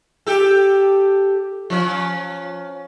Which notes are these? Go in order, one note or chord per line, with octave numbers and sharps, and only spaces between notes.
G4 A4
F3 C#4